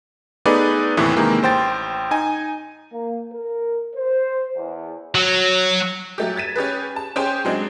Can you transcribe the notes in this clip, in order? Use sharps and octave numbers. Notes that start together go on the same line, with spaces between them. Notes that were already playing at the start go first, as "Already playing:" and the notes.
A3 B3 D#4 G#4 B4 D5
D#2 A2 C3 E3
C3 D#3 E3 G#3 A#3
A1 C5 G5 A6
D#4 G#5
A#3
A#4
C5
E2
F#3
F#3 A3 G4
G#6 A6 B6 D#7 E7
C#4 G4 G#4 B4
A5
C#4 G4 G#4 C5 G5
F#3 G#3 C4 D4